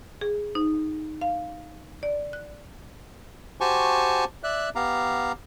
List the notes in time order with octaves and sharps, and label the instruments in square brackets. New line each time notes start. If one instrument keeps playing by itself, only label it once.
[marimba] G#4
D#4
F5
D5
F#6
[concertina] F#4 G4 C5 G#5 A5 C#6
D5 E5 F#6
B3 G4 F5 A#5